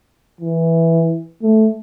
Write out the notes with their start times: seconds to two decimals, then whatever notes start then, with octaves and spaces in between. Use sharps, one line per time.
0.41 E3
1.43 A3